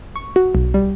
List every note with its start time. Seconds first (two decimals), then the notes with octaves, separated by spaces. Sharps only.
0.16 C#6
0.36 F#4
0.55 B1
0.74 G3